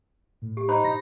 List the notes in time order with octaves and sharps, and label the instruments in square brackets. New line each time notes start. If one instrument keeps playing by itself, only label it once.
[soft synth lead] A2
[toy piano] G4
[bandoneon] D#4 [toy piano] C5 B5
[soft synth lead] A#6